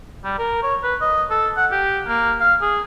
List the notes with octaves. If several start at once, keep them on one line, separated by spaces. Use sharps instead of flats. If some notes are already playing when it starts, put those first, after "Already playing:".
G3
A#4
C#5
B4
D#5
A4
F#5
G4
A#3
F5
G#4